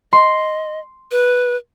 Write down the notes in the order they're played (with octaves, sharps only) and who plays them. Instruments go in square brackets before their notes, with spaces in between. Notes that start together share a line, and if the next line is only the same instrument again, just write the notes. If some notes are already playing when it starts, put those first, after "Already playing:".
[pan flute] D#5 [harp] C6
[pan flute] B4